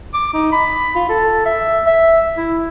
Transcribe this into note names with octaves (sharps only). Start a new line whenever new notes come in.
D6
D#4
B5
F4
A4
E5
E5
E4